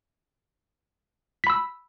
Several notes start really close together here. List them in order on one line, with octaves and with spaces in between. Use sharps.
B6 B5 E6